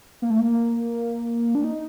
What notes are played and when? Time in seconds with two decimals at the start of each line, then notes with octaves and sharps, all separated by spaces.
0.22 A#3
0.30 A3
0.39 A#3
1.55 D4
1.64 D#4